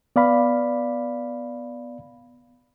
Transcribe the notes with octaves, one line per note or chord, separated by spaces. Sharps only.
B3 D5 F5 B5